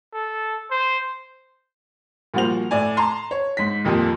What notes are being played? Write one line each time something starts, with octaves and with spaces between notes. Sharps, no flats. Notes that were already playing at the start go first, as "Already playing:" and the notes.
A4
C5
A#2 F3 G3 F#4 C5 F7
A2 D5 G#5
A5 A#5 C6
C#5
G#2 B6
D#1 F2 A#2 G4 D#6